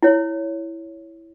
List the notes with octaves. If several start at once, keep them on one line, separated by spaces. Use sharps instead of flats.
E4 C#5